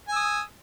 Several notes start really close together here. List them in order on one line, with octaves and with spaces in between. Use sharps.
G#5 E6 D#6